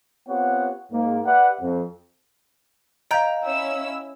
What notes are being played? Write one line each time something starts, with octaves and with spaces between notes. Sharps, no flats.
B3 C4 F4 G4 C#5 F#5
G#2 A#3
G4 B4 D5 E5 F#5
F2
D#5 F5 G5 A#5 G6
C#4 E4 E6